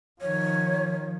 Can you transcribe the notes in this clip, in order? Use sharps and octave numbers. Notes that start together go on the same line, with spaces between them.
D#3 F3 C#5